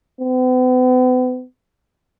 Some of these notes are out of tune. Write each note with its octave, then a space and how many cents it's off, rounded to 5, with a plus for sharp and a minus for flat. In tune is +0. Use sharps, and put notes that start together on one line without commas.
B3 +45